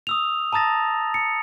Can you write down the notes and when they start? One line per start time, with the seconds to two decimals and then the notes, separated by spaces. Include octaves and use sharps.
0.07 D#6 E6 F7
0.53 A5 A#5 D#6 A6 A#6
1.14 C#7